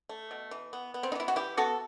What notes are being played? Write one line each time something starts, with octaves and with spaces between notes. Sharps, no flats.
A3
B2
E3
B3
B3
C4
D#4
E3 E4
F#4
E3 E4 G4
B3 F#4 A4